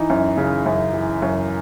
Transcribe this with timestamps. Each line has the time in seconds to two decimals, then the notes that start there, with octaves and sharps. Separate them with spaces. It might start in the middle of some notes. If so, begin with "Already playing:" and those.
Already playing: E3 D#4
0.10 F#2
0.37 C#3
0.66 F#2
0.93 E3
1.22 F#2